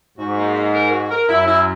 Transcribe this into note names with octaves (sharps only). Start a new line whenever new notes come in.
G#2 F#4
A#3
D#4
A#4
F#4
A#4
F#2 E4
E4